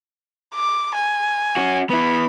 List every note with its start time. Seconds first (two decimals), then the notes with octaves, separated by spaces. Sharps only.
0.54 D6
0.95 G#5
1.57 C#4 F#4
1.90 B3 E4 B5